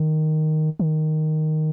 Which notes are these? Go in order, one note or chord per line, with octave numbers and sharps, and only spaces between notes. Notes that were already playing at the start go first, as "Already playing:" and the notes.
Already playing: D#3
D#3